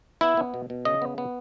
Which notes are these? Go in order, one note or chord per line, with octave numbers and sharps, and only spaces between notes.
B3 E4
B3
B2
B2
C#3 D#5
B3
B3